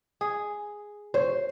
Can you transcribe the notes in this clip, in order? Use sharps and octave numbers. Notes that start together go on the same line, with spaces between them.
G#4
C5 C#5